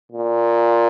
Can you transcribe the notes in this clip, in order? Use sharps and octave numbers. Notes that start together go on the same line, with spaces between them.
A#2